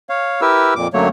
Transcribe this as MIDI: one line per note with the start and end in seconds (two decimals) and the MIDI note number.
0.09 0.41 73
0.09 0.41 77
0.41 0.74 64
0.41 0.74 67
0.41 0.74 70
0.41 0.74 71
0.41 0.74 88
0.76 0.88 41
0.76 0.88 46
0.76 0.88 86
0.94 1.09 42
0.94 1.09 50
0.94 1.09 54
0.94 1.09 57
0.94 1.09 58
0.94 1.09 73